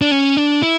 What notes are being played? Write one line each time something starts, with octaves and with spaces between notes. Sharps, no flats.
D4
C#4
D4
E4